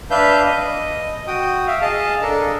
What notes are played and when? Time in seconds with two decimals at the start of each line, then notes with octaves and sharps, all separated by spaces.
0.11 D4 B4 E5 F5 G6
0.46 D#5
1.27 F#4 G5 D#6
1.67 E5 F5
1.81 G#4 D#5 F5 A5
2.22 D4 A4 A#4